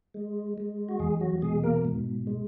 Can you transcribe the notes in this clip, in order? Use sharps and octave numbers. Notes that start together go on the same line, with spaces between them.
G#3
G#3
F#4
E2 G#3 G#4
F#3 F#4
B2 G#3 G#4
A#3 A#4
G#2
G#3